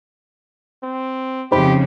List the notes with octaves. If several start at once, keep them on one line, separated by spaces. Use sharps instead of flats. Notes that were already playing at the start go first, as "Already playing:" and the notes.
C4
F2 C#3 F3 D#4 G4 C5 B5